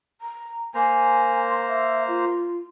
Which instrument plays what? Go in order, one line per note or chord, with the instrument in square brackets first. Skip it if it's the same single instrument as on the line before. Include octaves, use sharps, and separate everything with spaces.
[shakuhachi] A#5
[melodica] A#3 C5 A#5 [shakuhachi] G#5
[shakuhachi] C6
E5
F4